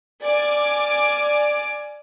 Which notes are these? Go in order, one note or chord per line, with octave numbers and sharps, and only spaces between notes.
D5 G#5 D6 F6